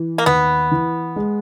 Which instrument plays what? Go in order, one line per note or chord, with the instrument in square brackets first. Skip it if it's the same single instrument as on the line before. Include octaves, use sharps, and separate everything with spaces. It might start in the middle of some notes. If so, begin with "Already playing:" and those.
Already playing: [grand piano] E3
[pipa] A#3
[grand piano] D#2 [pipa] B3
[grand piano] E3
G#3